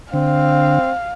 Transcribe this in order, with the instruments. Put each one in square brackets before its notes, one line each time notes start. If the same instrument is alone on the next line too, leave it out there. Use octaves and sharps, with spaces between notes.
[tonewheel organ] D3 [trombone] C4 [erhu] F5